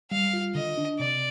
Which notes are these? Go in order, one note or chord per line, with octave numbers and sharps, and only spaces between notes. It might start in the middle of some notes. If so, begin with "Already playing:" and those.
G3 F5
F4
D3 D#5
D4
C3 D5